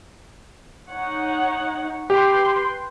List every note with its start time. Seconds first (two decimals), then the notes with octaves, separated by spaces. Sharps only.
0.90 D#4 C#5 F#5
2.10 G4 B4 G5 C6